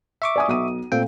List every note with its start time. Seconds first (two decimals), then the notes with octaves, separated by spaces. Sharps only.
0.22 E5 C#6 D6
0.36 D5 G#5 D#6
0.48 B1 D#6 D#7
0.92 A#2 A3 C4 F5 G5